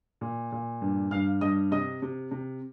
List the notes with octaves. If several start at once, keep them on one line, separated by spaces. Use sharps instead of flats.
A#2
A#2
G2
G2 F5 F6
G2 D#5 D#6
C3 D#5 D#6
C3
C3